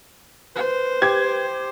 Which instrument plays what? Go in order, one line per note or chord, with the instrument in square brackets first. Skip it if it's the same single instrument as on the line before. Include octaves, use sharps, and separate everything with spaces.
[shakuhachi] B4 [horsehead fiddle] C5
[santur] G4 [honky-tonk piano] G#6